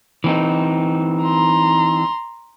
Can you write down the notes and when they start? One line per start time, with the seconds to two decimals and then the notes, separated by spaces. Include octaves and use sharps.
0.24 E3 C4 D#4
1.22 A#5 C6